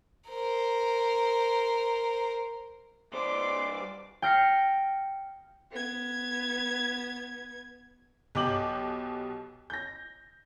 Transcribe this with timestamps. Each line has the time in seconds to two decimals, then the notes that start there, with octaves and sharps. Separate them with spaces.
0.29 A#4 C5
3.13 G2 C5 D5 C6 D6
4.22 G5 F6 A#6 C7 C#7
5.71 B3 G#6
8.35 B1 B2 G4 D6 G6 F#7
9.70 G6 A#6